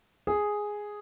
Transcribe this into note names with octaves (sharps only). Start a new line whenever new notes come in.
G#4